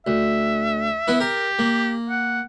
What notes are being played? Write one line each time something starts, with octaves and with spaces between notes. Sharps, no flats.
D2 E5
B3 E4 B4
G4 A#4
A#3
F#5